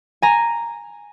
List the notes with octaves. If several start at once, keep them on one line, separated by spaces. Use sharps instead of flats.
G#5 A#5